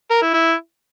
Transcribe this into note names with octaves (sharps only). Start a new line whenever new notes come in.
A#4
E4
E4